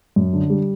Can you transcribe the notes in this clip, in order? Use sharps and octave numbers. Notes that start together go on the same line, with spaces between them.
F#2
D3
G3